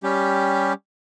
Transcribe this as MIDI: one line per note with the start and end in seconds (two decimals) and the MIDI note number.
0.03 0.73 55
0.03 0.73 61
0.03 0.73 67